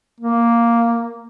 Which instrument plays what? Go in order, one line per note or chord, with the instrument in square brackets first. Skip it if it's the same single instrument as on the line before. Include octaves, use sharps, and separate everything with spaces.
[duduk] A#3